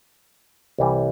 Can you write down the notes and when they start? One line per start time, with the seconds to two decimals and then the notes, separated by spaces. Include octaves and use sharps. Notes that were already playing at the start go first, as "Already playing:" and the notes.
0.78 C2 C3 E3 G3